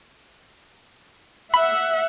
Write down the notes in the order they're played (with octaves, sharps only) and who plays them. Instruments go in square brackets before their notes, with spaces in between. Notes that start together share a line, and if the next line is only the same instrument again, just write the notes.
[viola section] E5 F#5 [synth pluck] B5